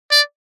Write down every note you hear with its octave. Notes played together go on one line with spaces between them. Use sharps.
D5